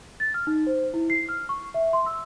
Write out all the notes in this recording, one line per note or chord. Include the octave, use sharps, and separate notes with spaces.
A6
F6
D#4
C5
E4
C7
F6
C#6
E5
C6
E6